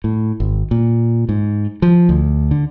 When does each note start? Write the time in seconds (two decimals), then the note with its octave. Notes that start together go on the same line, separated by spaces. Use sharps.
0.04 A2
0.40 G#1
0.71 A#2
1.29 G#2
1.82 F3
2.09 D2
2.51 D3